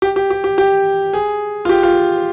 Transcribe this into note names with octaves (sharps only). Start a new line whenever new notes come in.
G4
G4
G4
G4
G4
G#4
F4
G4
F4